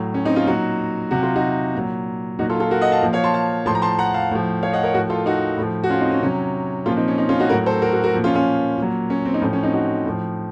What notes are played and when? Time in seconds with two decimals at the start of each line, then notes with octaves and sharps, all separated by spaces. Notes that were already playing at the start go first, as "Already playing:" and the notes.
Already playing: A2 F#3
0.14 C#4
0.25 C4 D#4
0.36 C#4 F4
0.46 A#2 F#3 D#4 F#4
1.11 C3 F#3 F#4
1.23 F4
1.36 D#4 F#4
1.75 A#2 F#3
2.39 A#2 F#3 D#4 F#4
2.50 F4 A4
2.60 F4 A4
2.71 F#4 A#4
2.81 D#5 F#5
2.91 F5 A5
3.03 A#2 F3
3.13 C#5 F5
3.24 A5 C6
3.34 F5 A5
3.66 A2 F3 A5 C6
3.75 A#5
3.82 A5 C6
3.99 F#5 A#5
4.14 F5 A5
4.31 A2 F3
4.63 C#5 F5
4.73 D#5 F#5
4.83 A#4 C#5
4.94 A2 F3 F#4 A#4
5.10 F4 A4
5.26 D#4 F#4
5.58 A2 F3
5.84 F#4
5.90 C#4 F4
6.00 C4 D#4
6.11 C#4
6.22 C3 F#3 C#4
6.86 A#2 F3 C#4 F4
6.97 C4 D#4
7.08 C#4
7.18 C4 D#4
7.29 C#4 F4
7.39 D#4 F#4
7.49 A2 F#3 F#4 A#4
7.66 A4 C5
7.82 F#4 A#4
7.92 F#4 A#4
8.04 F#4 A#4
8.14 A#2 F3
8.24 C#4 F4
8.35 C#4 F4
8.78 A#2 F#3
9.10 C#4
9.25 C4
9.34 D#4
9.42 A2 F3 C#4
9.53 C#4
9.63 C4 D#4
9.74 D#4 F#4
10.05 A2 F3